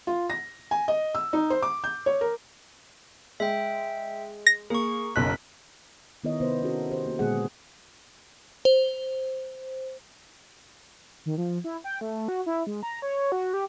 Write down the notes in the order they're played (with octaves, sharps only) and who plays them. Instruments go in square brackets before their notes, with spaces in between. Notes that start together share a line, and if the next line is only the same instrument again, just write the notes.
[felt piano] F4
A#6
G#5
D#5
E6
D#4
C5
D6
G6
C#5
A#4
[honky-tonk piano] G#3 [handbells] E5 G5
[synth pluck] A#6
[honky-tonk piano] A#3 [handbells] G#4 C#6
[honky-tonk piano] F#1 B1 F#6 [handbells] B6
[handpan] D#3 B3 E4 A#4 C#5 D#5
C3 B3 B4 C5
B3 C#4 E4 F#4 A4 A#4
C#4 G4 C5
A#3 F#4
A#2 D3 G#3 B3 G#4 F#5
[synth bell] C5
[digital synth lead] D#3
F3
E4
G5
A3
F#4
E4
G#3
A#5
C#5
F#4
G4